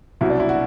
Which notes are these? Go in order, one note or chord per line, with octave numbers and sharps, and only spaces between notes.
C2 B2 F#3 E4
D4
E4
F#4